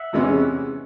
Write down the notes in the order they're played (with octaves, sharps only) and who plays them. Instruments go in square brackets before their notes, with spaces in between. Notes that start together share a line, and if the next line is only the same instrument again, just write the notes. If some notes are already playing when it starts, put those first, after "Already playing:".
Already playing: [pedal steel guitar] E5 F#5
[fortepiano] E2 C3 E3 G#3 C#4